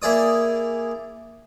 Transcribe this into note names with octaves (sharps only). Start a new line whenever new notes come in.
A#3 E4 G#4 D5 D#6